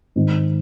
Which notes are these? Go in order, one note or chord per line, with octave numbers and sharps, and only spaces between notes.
G#2 D#3